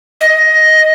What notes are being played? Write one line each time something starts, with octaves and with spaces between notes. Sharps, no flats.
D#5